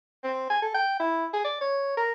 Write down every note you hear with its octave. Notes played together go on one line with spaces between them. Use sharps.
C4
G#5
A4
G5
E4
G#4
D5
C#5
A#4